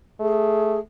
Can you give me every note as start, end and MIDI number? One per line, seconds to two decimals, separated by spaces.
0.20 0.78 57
0.20 0.79 68